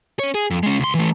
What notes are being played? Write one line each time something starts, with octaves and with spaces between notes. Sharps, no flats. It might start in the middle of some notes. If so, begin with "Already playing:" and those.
C#4 C#5
G#4
F2
G#3 C#4
C#2 C6
E3 A3